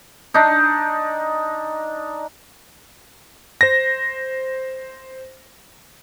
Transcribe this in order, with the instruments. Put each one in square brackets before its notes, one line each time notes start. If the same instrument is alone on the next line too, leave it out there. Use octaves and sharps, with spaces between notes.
[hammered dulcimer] D4 D#4
[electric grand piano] C5 A#6